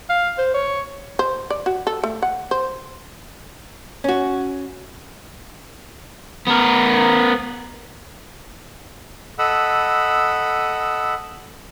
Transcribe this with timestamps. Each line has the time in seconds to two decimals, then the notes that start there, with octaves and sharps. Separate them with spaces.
0.09 F5
0.38 C5
0.54 C#5
1.19 C5
1.50 D5
1.66 F#4
1.87 A4
2.04 A3
2.22 F#5
2.51 C5
4.04 C#4 F#4
6.47 B3 A#4
9.39 A4 D#5 F#5 B5 E6